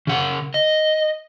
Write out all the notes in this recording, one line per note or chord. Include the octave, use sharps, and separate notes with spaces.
C#3 F#5
D#5